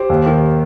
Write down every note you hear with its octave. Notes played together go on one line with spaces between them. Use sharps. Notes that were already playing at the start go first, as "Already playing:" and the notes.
Already playing: G4 C5
D#2
D#3